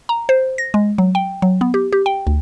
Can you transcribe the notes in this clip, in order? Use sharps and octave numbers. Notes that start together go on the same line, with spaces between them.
A#5
C5
A#6
G#3
F#3
G5
F#3
B3
G4
G4
G5
D2